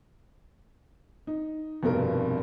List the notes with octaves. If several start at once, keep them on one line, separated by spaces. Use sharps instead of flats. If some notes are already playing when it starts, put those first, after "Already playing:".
D#4
F1 G2 B2 A#4